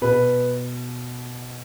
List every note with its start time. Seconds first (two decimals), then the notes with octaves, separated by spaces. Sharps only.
0.01 B2 B4